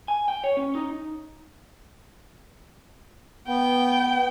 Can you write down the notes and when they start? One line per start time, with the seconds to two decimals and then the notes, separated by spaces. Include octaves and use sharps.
0.08 G#5
0.28 G5
0.44 C#5
0.57 C#4
0.75 D#4
3.47 B3 G5